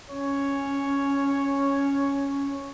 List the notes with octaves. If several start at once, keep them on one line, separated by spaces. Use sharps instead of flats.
C#4 C#5